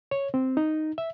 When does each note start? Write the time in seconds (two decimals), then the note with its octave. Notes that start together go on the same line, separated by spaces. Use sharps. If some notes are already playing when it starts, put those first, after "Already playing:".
0.11 C#5
0.34 C4
0.57 D#4
0.98 E5